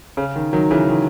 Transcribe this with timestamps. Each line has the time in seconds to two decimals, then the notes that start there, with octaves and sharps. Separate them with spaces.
0.17 C#3
0.36 D#3
0.53 D#3 F#3
0.71 C#3 E3
0.88 D#3